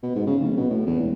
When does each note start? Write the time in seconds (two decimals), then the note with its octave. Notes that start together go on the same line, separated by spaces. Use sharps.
0.03 B2
0.16 G#2
0.27 C#3
0.40 D1
0.57 B2
0.70 A2
0.87 E2
1.00 E1